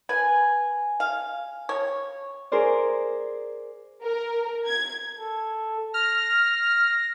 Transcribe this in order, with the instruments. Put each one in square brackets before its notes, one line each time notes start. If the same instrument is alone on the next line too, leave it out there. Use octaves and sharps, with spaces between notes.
[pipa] B4 [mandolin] G#5
[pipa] F5
C#5
[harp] G#4 A#4 C5 D5
[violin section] A#4
G#6
[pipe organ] A4
[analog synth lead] F6 [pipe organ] A#6